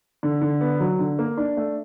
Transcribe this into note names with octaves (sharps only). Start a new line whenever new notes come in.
D3
D3
B3
F#3
D3
A#3
D4
A3